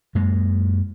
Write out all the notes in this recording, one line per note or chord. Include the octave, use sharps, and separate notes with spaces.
F#2 G#3 A#3